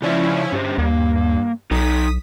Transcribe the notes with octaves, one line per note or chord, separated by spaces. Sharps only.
C#3 F3 C#4 E4 D5 E5
G2 C#4 G4 C5
D#2 A#3
B1 D#4 A4 A#5 D#6 B6